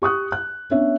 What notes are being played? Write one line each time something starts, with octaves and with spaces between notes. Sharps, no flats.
G4 C#6 D#6 F#6
F#6
B3 C#4 D4 C#5 E5